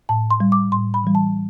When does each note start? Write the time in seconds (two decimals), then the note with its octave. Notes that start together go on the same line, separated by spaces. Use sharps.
0.09 A2 A5
0.31 C6
0.40 G3
0.52 D6
0.72 A2 C6
0.94 B5
1.04 E3 G3
1.15 A5